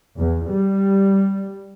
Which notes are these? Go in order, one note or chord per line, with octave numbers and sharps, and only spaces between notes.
E2
G3